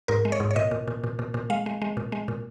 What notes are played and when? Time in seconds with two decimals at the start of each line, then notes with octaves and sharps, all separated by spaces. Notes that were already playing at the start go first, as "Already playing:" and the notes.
0.08 G#2 A#4
0.25 G#3
0.32 C#5
0.40 G#2
0.51 C#5
0.56 A#2 D#5
0.71 A#2
0.88 A#2
1.04 A#2
1.19 A#2
1.34 A#2
1.50 G#3 F5
1.66 G#3
1.82 G#3
1.97 A#2
2.12 G#3
2.28 A#2